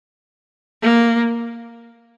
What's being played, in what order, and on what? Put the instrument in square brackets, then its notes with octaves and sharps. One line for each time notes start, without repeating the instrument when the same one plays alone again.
[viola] A#3